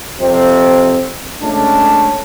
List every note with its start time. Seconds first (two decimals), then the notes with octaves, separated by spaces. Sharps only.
0.20 F2 C3 C4
1.41 C#2 A3 C#4 D4